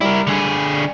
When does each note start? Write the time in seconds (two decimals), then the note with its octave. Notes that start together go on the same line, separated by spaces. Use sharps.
0.01 G3 E4 A#4
0.27 D3 G#4